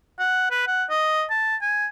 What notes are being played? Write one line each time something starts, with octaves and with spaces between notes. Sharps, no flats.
F#5
B4
F#5
D#5
A5
G#5